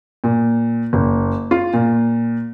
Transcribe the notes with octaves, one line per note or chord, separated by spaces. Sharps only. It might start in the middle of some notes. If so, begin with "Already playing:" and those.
A#2
F#1
F4
A#2